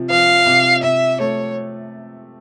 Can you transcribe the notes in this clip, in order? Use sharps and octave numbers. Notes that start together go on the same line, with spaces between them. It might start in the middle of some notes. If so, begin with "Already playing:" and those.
Already playing: C3 F3
F3 F5
C3
C3 E5
A3 C#5